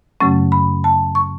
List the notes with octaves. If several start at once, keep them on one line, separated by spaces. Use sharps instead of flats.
F#2 C#3 F#3 A3 C#4 C#6
B5
A5
C#6